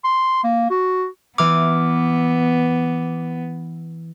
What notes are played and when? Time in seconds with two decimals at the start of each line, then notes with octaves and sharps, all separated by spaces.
0.04 C6
0.44 A#3
0.70 F#4
1.38 E3 B3 D6 F6